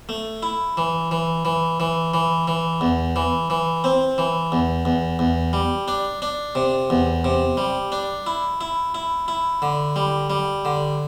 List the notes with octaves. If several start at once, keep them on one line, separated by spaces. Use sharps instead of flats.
A3
E4
E3
E3
E3
E3
E3
E3
E2
E3
E3
C4
E3
E2
E2
E2
G3
D4
D4
C3
E2
C3
G3
D4
E4
E4
E4
E4
D3
G3
G3
D3